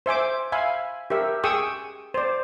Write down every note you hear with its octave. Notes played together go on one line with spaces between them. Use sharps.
C5 E5 G#5 D6
E5 F5 G#5 B5
G4 A#4 E5
G#4 G5 C#6 D#6 E6
C5 D5